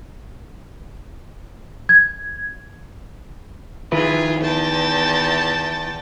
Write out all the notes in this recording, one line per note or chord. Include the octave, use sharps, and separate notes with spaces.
G#6
D#3 E4 F4 G#4 B4
E2 G5 A5